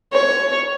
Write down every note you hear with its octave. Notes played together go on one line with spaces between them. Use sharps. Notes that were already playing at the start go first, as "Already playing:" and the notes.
C#5